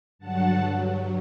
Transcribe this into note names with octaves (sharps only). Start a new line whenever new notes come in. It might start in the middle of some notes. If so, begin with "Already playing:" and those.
G2 D3 F#3 F#5 A5
G2 F#3